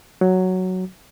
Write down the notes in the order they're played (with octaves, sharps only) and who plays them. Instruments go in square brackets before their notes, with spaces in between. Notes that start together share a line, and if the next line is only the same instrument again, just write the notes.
[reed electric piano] F#3